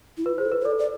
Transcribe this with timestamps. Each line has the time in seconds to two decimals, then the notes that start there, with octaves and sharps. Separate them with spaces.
0.17 E4
0.25 F4 B4
0.38 G#4 C5
0.46 A4
0.52 B4
0.61 C5
0.65 A4 D5
0.79 D5